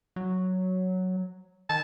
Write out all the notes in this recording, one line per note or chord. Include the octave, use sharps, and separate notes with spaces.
F#3
D#3 A5